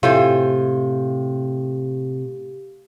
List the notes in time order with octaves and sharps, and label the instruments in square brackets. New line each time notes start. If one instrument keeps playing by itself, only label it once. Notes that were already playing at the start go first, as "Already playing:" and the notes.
[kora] A2 [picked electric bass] C3 [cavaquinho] F4 C5 G#5 [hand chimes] G4